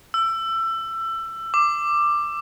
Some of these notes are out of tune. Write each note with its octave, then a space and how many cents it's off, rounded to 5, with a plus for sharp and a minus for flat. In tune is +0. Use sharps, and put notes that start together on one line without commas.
E6 +20
D6 +10